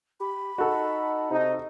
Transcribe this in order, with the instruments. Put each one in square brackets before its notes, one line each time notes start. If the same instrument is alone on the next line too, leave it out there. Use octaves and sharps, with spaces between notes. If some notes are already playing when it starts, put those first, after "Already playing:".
[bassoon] G4 [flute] B5
[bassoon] D#4 [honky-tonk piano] F#4 A4
[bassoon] C3 [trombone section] D#4